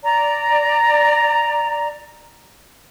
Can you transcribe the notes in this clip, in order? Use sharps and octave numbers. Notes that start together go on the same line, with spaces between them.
D5 A#5